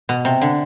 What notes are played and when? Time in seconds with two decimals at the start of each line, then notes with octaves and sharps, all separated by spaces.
0.09 B2
0.25 C3
0.41 D3